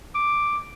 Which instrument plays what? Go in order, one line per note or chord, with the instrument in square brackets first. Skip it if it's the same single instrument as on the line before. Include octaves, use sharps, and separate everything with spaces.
[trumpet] D6